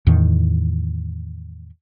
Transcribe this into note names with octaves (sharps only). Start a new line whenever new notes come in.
E2 A2 D#3